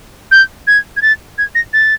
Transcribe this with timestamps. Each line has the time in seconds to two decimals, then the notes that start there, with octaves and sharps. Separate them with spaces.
0.31 G6
0.67 G#6
0.96 G#6
1.02 A6
1.38 G#6
1.55 A#6
1.73 A6